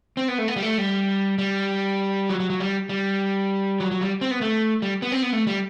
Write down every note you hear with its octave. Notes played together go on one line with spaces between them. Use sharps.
C4
B3
A3
B3
G3
A3
G3
G3
F#3
F#3
F#3
G3
G3
F#3
F#3
G3
C4
B3
A3
G3
B3
C4
B3
A3
G3